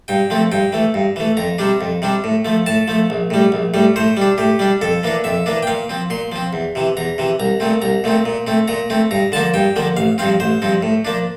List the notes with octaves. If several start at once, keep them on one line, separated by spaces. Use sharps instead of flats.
G2 G5
F3 A3 C4
G2 G5
E3 A3
G2
E3 A3
F2 A#5
C3 G3 D4
F2
C3 G3 D4
A2
F3 A3
A2 A5
F3 A3
A#1
A2 G3
A#1
A2 G3
A2 C5
G3 D4
A2 G4
G3 D4
F2 A4
E3 A#3 D4
F2 E5
E3 A#3 D4
G5
A#2 F5
F3 C4
A#2 C6
F3 C4
E2
C3 E3
E2 A#5
C3 E3
C2 A#5
A#2 A3 C4
C2 A#5
A#2 A3 C4
A#2
A3 C4
A#2 A#5
A3 C4
G2 A#5
D3 F3 A#3 A5
G2 G5
D3 F3 A#3
A1 F5
G2 F3 C4 F5
A1 C5
G2 F3 C4
A2
F3 A#3 D4